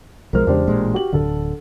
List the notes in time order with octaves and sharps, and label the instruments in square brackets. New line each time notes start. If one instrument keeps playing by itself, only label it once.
[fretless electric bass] B1 F3 G#3 [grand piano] A#4 C5 F6
[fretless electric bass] E2 C#3 G#3 [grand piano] D4 G4 C5
[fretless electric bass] A1 A#2 G#3
[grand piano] F#4 G4 F#7
[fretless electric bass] D1 [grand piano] D3 A4